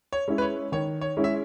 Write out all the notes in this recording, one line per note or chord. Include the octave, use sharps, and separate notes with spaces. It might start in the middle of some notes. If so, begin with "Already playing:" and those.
C#5
G#3 C#4 E4
B4
C#5
D#3 C#5
C#5
G#3 C#4 E4
E5